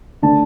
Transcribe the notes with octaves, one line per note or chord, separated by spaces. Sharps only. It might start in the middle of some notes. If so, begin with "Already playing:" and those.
D3 A3 D4 A5